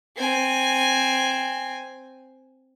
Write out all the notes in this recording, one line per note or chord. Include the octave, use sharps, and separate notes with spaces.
C4 G#5